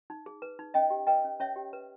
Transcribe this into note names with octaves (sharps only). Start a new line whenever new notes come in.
D#4
G#4
B4
D#4
C#4 D#5 G5
G4
B4 D#5 G5
C#4
C#4 C#5 E5
G4
B4